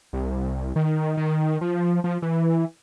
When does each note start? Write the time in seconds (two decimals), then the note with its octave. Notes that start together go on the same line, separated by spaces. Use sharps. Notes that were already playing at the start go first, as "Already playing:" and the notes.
0.13 C2
0.76 D#3
1.17 D#3
1.61 F3
2.04 F3
2.22 E3